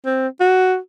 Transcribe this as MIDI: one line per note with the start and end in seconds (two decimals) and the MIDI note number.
0.06 0.28 60
0.40 0.77 66